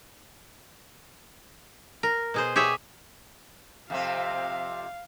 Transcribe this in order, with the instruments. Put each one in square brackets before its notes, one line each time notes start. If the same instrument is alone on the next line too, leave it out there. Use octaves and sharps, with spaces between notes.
[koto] A#4
B2 G#4 C5
G4 G#4 C#5 E5
[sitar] F2 C3 C4 [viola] F5